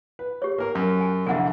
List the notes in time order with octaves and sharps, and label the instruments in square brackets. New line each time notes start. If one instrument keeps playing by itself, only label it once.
[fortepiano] B4
[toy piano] G4 C#5
[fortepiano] A#3 A#4
F#2
[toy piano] G#5
[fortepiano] C2 F2 D3 [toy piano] E5 F#5 G#5